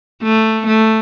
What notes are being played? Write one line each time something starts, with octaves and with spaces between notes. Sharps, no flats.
A3
A3